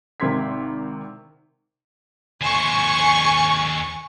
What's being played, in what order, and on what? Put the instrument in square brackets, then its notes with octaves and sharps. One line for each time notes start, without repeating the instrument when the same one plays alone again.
[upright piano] G#1 C3 A#4 C6 G#6 B6
[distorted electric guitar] D#2 C5 [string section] G#5 C#6